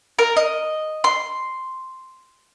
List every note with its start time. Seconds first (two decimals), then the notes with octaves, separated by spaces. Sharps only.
0.19 A#4
0.37 D#5
1.04 C6